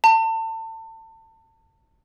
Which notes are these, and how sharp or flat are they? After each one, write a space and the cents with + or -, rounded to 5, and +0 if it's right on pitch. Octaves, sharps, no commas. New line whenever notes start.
A5 +30